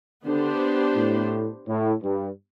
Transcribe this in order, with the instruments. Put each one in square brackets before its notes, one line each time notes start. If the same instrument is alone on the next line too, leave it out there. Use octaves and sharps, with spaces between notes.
[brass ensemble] D3 [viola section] B3 D4 G4 C5
[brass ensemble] A2
A2
G2